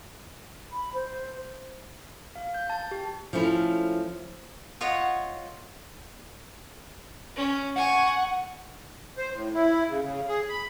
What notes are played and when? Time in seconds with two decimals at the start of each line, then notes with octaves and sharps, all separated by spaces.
0.72 B5
0.94 C5
2.36 F5
2.54 G6
2.70 A5
2.91 G4
3.33 F3 A3 C#4 E4
4.81 F4 C#5 D#5 F#5
7.36 C#4
7.76 F#5 G#5 C#6
9.17 C5
9.34 A2
9.54 E4
9.89 C#3
10.02 C#3
10.28 G#4
10.49 B5